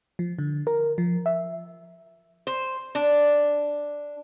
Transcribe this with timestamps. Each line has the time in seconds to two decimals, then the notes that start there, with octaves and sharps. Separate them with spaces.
0.19 F3
0.39 D3
0.67 A#4
0.98 F3
1.26 E5
2.47 C5
2.95 D4